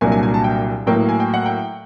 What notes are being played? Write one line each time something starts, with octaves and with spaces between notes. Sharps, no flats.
C2 A#2 F#3 A#3 D4 G#5
G#5
G#5
A5
G5
A2 F#3 A#3 G5
G#5
G5
F#5
G5